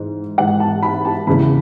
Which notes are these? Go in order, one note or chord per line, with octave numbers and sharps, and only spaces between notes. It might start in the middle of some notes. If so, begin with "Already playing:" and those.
Already playing: G#2 E3
G#2 E3 F#5
A5
B5
A5
E2 C#3 E3 B5